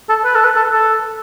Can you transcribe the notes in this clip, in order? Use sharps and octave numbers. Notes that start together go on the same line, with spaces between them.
A4
B4
A4
B4
A4
A4